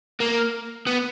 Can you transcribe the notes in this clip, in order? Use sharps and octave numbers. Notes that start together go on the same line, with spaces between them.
A#3
B3